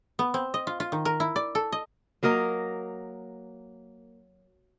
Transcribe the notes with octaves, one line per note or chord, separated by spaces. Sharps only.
B3
C4
D#5
F4
F4
D#3
A#4
E4
D5
A4
D#5
F#3 A#3 A#4 D#5